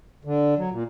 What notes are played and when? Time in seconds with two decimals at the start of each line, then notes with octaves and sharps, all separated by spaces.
0.25 D3
0.58 F#3
0.72 A#2